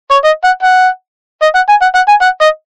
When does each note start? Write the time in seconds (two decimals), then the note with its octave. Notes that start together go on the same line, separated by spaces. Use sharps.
0.11 C#5
0.24 D#5
0.44 F#5
0.63 F#5
1.42 D#5
1.55 F#5
1.69 G#5
1.82 F#5
1.95 F#5
2.08 G#5
2.21 F#5
2.41 D#5